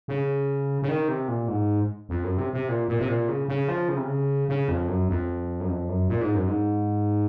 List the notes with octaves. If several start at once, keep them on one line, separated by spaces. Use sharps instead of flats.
C#3
C#3
D#3
C3
A#2
G#2
F2
F#2
C3
C3
A#2
A#2
C3
A#2
C#3
C#3
F3
C#3
C3
C#3
C#3
F2
F#2
F2
F#2
F2
F#2
A#2
G#2
F#2
G#2